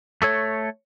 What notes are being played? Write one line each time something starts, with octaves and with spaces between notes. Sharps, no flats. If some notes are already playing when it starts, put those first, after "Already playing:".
A3 A4 C#5